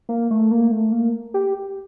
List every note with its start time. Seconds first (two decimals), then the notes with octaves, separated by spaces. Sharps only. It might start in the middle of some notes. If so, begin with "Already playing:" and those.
0.09 A#3
0.31 A3
0.51 A#3
0.71 A3
0.92 A#3
1.34 G4